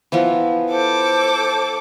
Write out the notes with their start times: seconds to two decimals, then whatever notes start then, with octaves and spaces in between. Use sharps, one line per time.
0.12 E3 F3 B3
0.71 A4 C5 D6